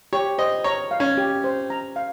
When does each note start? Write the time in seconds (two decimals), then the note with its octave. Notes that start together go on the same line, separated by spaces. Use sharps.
0.13 G4 C#5
0.38 C5 D#5
0.64 C#5 A#5
0.91 F5
1.00 C#4
1.17 G4
1.44 C5
1.70 A#5
1.96 F5